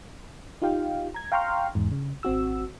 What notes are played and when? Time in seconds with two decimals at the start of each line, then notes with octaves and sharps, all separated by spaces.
0.62 D#4 F4 G4 F5 G5
1.14 A#5 G#6
1.32 F5 G5 A#5 C6 C#6 F6
1.75 E2 G#2
1.92 C#3
2.23 G#1 C4 F#4 E6